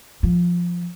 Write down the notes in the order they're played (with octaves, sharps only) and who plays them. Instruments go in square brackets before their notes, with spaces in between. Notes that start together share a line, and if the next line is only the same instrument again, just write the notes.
[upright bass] F3